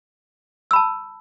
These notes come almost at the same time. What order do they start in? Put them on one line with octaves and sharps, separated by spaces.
E6 B5 A5